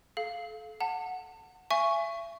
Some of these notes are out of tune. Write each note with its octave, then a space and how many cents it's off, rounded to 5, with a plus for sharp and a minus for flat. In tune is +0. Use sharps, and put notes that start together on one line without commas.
A4 -30 F5 +0
F#5 -10 A5 +30
E5 +40 G#5 +5 C#6 +0